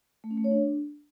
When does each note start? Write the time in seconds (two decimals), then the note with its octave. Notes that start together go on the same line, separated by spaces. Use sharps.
0.24 A3
0.31 C#4
0.37 A3
0.44 C#5
0.51 D4